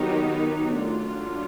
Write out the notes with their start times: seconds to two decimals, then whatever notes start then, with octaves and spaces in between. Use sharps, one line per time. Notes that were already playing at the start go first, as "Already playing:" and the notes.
Already playing: D#3 F#3 B3 D#4 G4
0.75 F#3 A3 D4 F4